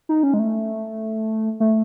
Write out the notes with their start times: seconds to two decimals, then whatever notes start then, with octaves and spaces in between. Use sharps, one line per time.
0.09 D#4
0.23 C#4
0.34 G#3
0.39 A3
1.60 A3